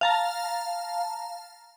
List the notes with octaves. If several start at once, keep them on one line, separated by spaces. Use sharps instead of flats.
F5 A5 A#5